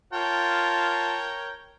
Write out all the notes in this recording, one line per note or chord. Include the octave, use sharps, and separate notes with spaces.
F4 A#4 C#5 G5 A5